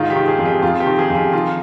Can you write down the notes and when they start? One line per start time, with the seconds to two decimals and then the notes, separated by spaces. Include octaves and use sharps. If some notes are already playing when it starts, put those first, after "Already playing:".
Already playing: G#2 D#3 F4
0.10 G4
0.16 D#3
0.28 G#4
0.39 F2
0.45 G4
0.62 F2 F4
0.80 G4
0.86 D#3
0.99 G#4
1.10 F2
1.16 G4
1.33 D#3 F4